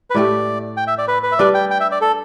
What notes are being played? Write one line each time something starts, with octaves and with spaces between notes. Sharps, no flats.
B4
A2 A3 G4 D5
G5
E5
D5
B4
B4
E5
G3 D4 B4 D5
G5
G5
E5
D5
A4